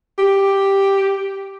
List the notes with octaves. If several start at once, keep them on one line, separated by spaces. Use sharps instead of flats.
G4